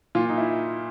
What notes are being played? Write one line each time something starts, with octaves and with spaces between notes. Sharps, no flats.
A#2 F4
D#4
E4